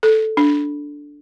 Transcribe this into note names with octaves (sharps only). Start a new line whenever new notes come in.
A4
D4